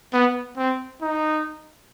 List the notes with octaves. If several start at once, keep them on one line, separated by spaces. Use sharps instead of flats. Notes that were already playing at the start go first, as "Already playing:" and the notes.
B3
C4
D#4